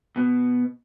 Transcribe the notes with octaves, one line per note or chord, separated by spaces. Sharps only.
B2 B3